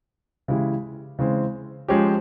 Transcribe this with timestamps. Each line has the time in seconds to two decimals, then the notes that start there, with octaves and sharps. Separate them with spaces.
0.48 C#3 E3 G#3 E4 G4
1.19 C#3 E3 G#3 C4
1.88 F3 G#3 C#4 G4